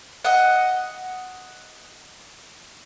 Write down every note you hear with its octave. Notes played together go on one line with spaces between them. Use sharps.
D#5 F#5